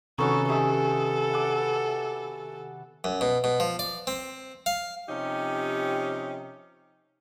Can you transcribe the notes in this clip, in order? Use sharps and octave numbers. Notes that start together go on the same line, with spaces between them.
C3 D#3 B3 C#4 F#4 A4 A#5 C#6
D#4 G4 A4 E5 G#5
F#5 D6
F#2
B2
B2
F3
D5
C4
F5
C3 F3 C#4 D#4 G4